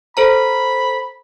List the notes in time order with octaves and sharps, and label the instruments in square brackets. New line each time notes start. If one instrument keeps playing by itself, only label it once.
[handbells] A4 C5 A#5 [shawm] B5